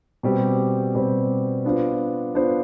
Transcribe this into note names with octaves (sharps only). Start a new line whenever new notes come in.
B2 G3 C4 G4
B2 G3 C4 G4
B3 D4 F4 C5
B3 D4 F4 C5